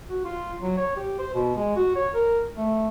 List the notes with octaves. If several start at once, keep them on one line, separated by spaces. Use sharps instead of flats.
F#4
F4
F#3
C#5
G4
C5
B2
G#3
F#4
C#5
A#4
A3